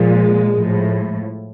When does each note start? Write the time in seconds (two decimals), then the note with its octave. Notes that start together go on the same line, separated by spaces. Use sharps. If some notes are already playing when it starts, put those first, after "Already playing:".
Already playing: A#2 F3 G#3
0.55 A2 F3